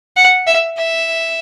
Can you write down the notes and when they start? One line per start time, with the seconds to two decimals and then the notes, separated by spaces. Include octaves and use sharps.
0.17 F#5
0.47 E5
0.77 E5